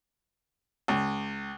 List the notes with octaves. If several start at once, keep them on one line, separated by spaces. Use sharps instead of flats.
C#2